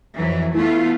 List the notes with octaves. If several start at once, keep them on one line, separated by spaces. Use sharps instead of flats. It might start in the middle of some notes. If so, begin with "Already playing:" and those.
F2 E3 F#3
E3 A3 B3 F4